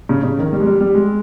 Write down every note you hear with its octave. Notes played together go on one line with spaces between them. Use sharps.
C#3
C#3
D#3
G3
G#3
G3
G3
G#3